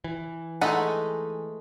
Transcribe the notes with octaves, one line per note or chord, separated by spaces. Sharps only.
E3
G#3 A3 D#4 D#5 F#5 B5